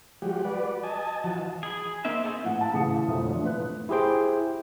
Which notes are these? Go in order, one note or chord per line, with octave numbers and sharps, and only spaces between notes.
F3 G3 G#3 F#4 G4
F#4 B4 D5
D#5 G#5 A5
E3 F3 F#4 A5
G#4 B5
A#3 C4 D#4 E5
G#4 A4 C5 C#5 D#5
A1 F#5
F5 A5
A1 C#3 E3 D#6 C#7
E1 F2 D3 A3 E5 D#6
F3 D4
A2 B4 F#6
E4 G4 G#4 C5 G5